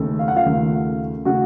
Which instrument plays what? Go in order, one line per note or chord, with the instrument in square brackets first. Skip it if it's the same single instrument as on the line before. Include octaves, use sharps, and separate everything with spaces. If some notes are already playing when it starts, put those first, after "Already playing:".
Already playing: [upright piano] D#2 C#3 A3
F5
F#5
F4 F5
D#2 C#3 A3
C#3 A3 F#4 F#5